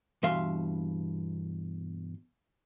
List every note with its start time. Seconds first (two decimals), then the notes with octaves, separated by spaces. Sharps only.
0.23 G2 B2 E3 E5 F5 C6